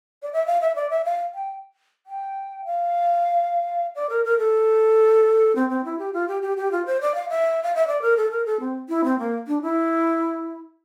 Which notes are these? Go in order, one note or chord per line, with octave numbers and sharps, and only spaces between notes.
D5
E5
F5
E5
D5
E5
F5
G5
G5
F5
D5
A#4
A#4
A4
C4
C4
E4
G4
F4
G4
G4
G4
F4
C5
D5
F5
E5
F5
E5
D5
A#4
A4
A#4
A4
C4
E4
C4
A#3
D4
E4